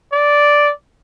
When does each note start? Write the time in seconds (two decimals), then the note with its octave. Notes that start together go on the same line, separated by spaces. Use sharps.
0.13 D5